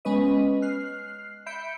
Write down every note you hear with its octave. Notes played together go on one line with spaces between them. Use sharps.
G#3 B3 C#4 B4 D#5
F6 F#6 C7
E5 B5 G6 C#7 D7